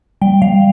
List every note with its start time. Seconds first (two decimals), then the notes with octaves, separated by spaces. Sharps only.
0.22 G3 G5
0.42 G3 F5